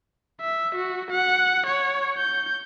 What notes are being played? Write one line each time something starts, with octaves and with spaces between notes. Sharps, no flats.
E5
F#4
F#5
C#5
G6